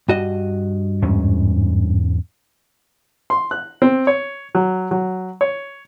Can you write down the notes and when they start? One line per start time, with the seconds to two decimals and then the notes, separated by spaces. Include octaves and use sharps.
0.09 G2 F#4 D#5
1.02 E2 G#2 C#4
3.30 C6
3.51 F#6
3.82 C4
4.07 C#5
4.55 F#3
4.91 F#3
5.41 C#5